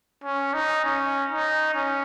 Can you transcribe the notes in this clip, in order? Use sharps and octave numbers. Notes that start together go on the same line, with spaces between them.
C#4
D#4
C#4
D#4
C#4